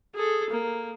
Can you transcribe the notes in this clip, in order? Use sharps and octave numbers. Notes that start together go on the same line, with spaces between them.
G#4 A4
A#3